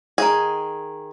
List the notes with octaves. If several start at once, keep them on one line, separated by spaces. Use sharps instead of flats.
D#3 G#4